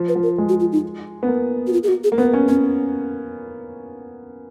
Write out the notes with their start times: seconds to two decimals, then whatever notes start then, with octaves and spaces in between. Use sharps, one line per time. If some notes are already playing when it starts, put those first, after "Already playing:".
Already playing: F3
0.08 B4
0.15 F3
0.23 A#4
0.38 G#3
0.49 F#4
0.60 F4
0.72 D#4
1.23 B3
1.28 A#3
1.67 F#4
1.73 F4
1.83 G#4
1.88 F#4
2.04 G#4
2.12 A#3
2.18 B3 B4
2.34 C#4
2.48 B3 C#4